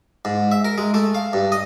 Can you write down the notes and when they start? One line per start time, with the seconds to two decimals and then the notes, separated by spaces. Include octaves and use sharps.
0.25 G#2
0.52 E5
0.65 A#4
0.78 G#3
0.94 A3
1.15 F5
1.33 G2
1.52 D#5